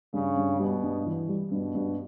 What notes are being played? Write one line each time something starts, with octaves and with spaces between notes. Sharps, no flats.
G2 C#3
G2
B2 G3
G2
E3
G3
G2 B2
G2